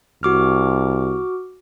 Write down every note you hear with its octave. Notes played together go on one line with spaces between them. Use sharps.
C2 F#4 D6 F6